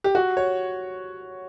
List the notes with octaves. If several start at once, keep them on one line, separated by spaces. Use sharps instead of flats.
G4
F#4
C#5